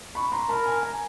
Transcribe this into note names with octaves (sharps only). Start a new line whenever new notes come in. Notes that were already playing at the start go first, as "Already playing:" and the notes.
B5 C#6
A#5 C6
A#4 A5 B5
G#5 A#5
G#5 A#5